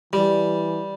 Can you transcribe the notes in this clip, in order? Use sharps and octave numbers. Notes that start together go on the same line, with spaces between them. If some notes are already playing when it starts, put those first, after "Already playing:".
E3 G3